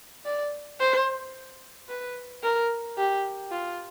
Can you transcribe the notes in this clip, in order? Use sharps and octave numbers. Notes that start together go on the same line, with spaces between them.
D5
C5
B4
A#4
G4
F4